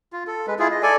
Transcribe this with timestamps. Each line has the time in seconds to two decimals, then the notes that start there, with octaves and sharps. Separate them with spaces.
0.13 F4
0.27 A4
0.47 G#3 B4
0.59 E4 F4 G#4
0.71 D#5
0.83 A4 D5 G#5